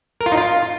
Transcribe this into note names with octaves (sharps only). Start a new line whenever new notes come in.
A#4
F4
D#4
F4